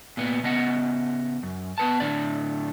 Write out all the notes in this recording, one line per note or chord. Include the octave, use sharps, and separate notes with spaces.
A#2 A#3 B3
C#3 B3 D#5 F#5
F#2
B3 B4 A5
A2 D3 D5